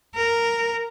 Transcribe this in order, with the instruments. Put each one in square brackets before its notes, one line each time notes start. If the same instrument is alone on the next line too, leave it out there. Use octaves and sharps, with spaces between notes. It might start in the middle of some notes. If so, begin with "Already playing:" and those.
[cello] A#4